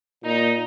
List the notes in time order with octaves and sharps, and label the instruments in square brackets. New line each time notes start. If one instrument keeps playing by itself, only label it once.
[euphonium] A#2 [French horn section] D#4